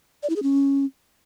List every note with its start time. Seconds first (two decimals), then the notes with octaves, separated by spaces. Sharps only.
0.23 D5
0.29 E4
0.36 G#4
0.43 C#4